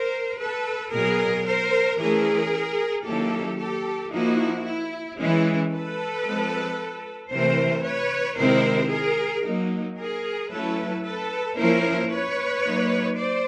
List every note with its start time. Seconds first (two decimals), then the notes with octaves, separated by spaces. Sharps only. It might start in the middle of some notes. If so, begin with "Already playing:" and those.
Already playing: A#4 C5
0.40 A4 B4
0.93 B2 F#3 B3 G#4 A#4
1.46 A#4 C5
1.99 E3 A3 C#4 G#4 A#4
3.05 D#3 F#3 A#3 C#4 E4 G4 A4
3.59 G4 A4
4.12 F3 A#3 D#4 E4 F#4
4.66 E4
5.19 E3 G#3 C#4 E4
5.71 A4 B4
6.25 F3 G#3 C4
7.31 C3 E3 A3 A#4 C5
7.84 B4 C#5
8.38 C3 D#3 G#3 C4 E4 A#4 C5
8.91 G#4 A#4
9.44 F#3 A#3 D#4
9.98 G#4 A#4
10.51 F#3 A3 C#4 E4 A4 B4
11.04 A4 B4
11.57 F3 A#3 C#4 E4 A#4 C5
12.11 B4 C#5
12.64 F#3 A#3 D#4
13.17 C5 D5